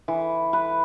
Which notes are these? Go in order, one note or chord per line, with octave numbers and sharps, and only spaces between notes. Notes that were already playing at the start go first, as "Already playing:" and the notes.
E3
B4